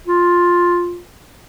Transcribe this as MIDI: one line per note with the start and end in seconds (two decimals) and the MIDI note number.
0.07 0.99 65